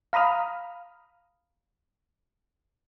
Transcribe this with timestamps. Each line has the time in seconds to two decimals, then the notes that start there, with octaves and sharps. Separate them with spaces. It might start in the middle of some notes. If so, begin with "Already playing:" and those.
0.13 F5 A#5 B5 D#6 F6